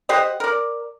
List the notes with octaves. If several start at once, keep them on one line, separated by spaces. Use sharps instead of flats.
G4 C5 D#5 F#5
A#4 D5